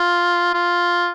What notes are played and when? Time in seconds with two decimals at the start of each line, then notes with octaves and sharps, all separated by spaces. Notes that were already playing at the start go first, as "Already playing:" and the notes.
Already playing: F4
0.54 F4